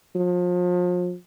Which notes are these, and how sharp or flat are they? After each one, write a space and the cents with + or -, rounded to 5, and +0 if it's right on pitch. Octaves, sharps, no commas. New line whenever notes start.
F3 +35